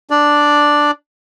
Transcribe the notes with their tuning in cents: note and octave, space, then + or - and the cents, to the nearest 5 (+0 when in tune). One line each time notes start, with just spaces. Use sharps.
D4 +0 D5 +0